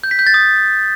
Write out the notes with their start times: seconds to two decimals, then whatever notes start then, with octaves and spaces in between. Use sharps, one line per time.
0.04 G6
0.11 B6
0.19 G6
0.27 A6
0.34 D#6